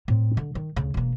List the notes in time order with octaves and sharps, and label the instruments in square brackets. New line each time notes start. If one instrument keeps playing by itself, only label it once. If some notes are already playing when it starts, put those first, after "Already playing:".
[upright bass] A2 C4
D3
D#3
D2 C#3
E1 A#3